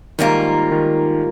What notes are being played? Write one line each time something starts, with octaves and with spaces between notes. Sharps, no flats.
G#2 D#3 G3 A#3 F4 A#4
D#3